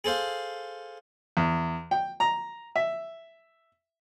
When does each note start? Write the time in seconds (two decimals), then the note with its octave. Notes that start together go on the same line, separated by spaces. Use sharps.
0.04 G#4 A4 C5 F5
1.37 E2
1.91 G5
2.20 A#5
2.76 E5